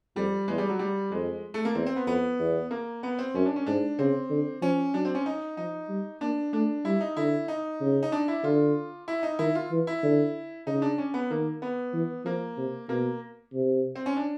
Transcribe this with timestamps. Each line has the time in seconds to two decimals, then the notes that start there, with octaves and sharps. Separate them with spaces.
0.16 F2 G3
0.48 E2 G#3
0.58 G3
0.69 F#3
0.79 G3
1.12 F2 G#3
1.54 A3
1.65 A#3
1.75 E2 C4
1.87 C4
1.96 B3
2.07 F2 B3
2.39 E2
2.71 A#3
3.03 B3
3.19 C4
3.35 F#2 C#4
3.46 D4
3.56 C#4
3.66 G#2 D4
3.99 C#3 C4
4.30 D3
4.62 F3 C#4
4.94 F#3 D4
5.05 C4
5.15 C#4
5.26 D#4
5.57 F3 D#4
5.89 G3
6.21 A#3 D4
6.53 A3 D4
6.85 G3 E4
7.01 D#4
7.17 D3 E4
7.48 D#4
7.81 C#3
8.03 D#4
8.12 D4
8.28 E4
8.44 D3 F4
9.08 E4
9.23 D#4
9.39 D#3 E4
9.55 F4
9.71 E3
9.87 E4
10.03 D3
10.67 C#3 D#4
10.82 D4
10.98 C#4
11.14 B3
11.30 D#3 A#3
11.62 B3
11.94 E3
12.25 F3 A#3
12.57 C3
12.89 B2 A#3
13.53 C3
13.96 C4
14.06 C#4
14.17 D4